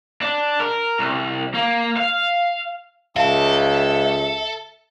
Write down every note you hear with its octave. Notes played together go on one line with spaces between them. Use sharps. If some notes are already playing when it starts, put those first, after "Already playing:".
D4
A#4
C2
A#3
F5
C#2 A4 E5 F5 A5